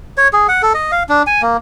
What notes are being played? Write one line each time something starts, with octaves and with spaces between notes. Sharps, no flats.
C#5
G#4
F#5
A4
D#5
F5
D4
G#5
A#3